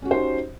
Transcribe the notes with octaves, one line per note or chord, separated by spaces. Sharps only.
C#4 D#4 F#4 G4 C5